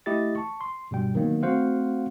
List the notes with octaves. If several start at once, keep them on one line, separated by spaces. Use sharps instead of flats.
A3 E4 G4 D#5 E5 A6
A5 C#6
C6
G2 B2 G3 G5
D#3 F#3 A#3 B3
A3 C4 F#4 C5 F5 F#5